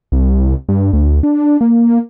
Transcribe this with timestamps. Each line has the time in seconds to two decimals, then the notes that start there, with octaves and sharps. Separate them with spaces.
0.12 C2
0.69 G2
0.93 D2
1.23 D4
1.61 A#3